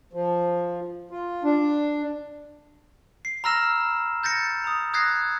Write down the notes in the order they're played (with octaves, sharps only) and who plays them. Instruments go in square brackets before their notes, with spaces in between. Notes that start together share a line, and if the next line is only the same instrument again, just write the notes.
[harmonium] F3
F4
D4
[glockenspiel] C7
A#5 B5 E6 F6 A#6 E7
G6 A6 A#6 C#7
A#5 D#6
D#6 F#6 G#6 A#6 C7